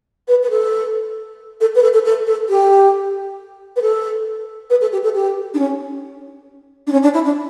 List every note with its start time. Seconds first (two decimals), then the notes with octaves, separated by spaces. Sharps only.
0.28 B4
0.43 B4
0.50 A4
1.60 A4
1.75 B4
1.82 A4
1.93 A4
2.05 A4
2.26 A4
2.49 G4
3.76 B4
3.81 A4
4.70 B4
4.81 A4
4.92 G4
5.03 A4
5.15 G4
5.54 D4
5.58 C#4
6.87 D4
6.92 C#4
7.02 D4
7.14 E4
7.24 D4